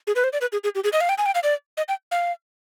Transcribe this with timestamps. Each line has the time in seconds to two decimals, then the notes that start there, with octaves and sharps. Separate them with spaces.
0.07 G#4
0.16 B4
0.24 C5
0.33 D5
0.41 B4
0.52 G#4
0.64 G#4
0.75 G4
0.84 G#4
0.93 D#5
1.01 F5
1.09 G5
1.18 G#5
1.26 G5
1.35 F5
1.43 D5
1.77 D#5
1.88 G5
2.11 F5